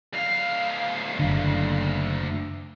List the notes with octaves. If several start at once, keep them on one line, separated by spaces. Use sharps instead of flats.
D2 F5
F#1 D3